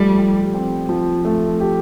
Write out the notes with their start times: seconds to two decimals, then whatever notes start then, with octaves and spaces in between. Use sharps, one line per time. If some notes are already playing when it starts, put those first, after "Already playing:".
Already playing: F3 G3 A3
0.18 G4
0.54 C4
0.89 F3
1.25 A3
1.60 G4